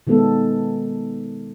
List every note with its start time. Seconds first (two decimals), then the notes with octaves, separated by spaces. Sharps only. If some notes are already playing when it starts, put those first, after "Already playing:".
0.07 B2 D#3 G#3 B3 A4